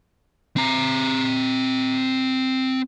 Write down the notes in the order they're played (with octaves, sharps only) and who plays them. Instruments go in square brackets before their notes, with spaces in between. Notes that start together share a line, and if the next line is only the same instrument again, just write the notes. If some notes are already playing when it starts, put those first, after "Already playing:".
[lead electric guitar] C4 A#5